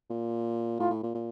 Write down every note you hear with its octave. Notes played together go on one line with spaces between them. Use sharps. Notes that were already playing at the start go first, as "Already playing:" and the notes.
A#2
A2 F4
A2
A#2
A#2